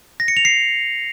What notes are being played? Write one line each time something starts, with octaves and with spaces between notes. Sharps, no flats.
A#6
C#7
F7
C7